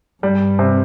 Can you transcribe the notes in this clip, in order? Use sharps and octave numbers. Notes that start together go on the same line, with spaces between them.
G2 G3
C3